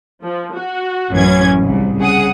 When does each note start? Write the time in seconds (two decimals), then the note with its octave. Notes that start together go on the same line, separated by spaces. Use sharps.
0.24 F3
0.55 F#4
1.12 A1 F#2 E3 C#4 G#6
1.59 C2 G#2
2.00 C#3 G#4 F#5 D#6